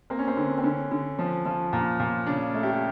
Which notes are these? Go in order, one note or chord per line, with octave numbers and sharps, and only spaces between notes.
A#3 C4
C#4
C4
D3
C4
D3 C#4
D3
F3
F3
A#2
A#2
C#3 D4
A3
G4